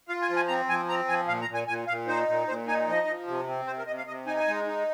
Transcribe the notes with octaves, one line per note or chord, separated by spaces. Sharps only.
F4 F5
G#5
F3
G#5
C4 A#5
F3 G#5
C4 A#5
F3 G#5
A#2 F5
A#5
A#2
G#5
A#2 G#5
A#2 F5
D#4 C5
A#2
A#2 C5
D#4 G#5
F3 D#5
F3
C3
C4
C3 C5
A#4
C3 D#5
F5
C3 D#5
D#4 G#5
G#5
G#3
D#4